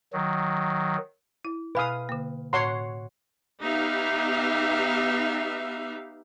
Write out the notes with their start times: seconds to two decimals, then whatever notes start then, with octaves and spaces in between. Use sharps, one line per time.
0.13 D#3 F#3
1.45 E4
1.75 B2 B4 F5 G#5 D#6
2.09 D3 A#3
2.53 A2 C#5 F#5 C6
3.62 B3 D#4 G4 E5 F5